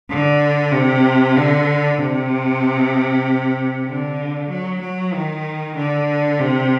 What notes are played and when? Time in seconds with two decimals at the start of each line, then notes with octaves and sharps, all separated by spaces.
0.10 D3
0.72 C3
1.36 D3
1.98 C3
3.87 D3
4.49 F#3
4.81 F#3
5.14 D#3
5.76 D3
6.39 C3